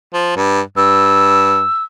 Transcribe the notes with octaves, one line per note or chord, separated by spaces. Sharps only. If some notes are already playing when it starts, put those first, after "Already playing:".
F3
G2
G2 E6